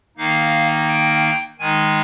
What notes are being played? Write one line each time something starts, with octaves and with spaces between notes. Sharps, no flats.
D#3 A#3 D#4 F5
G5
D#3 G#3 D#4 G#5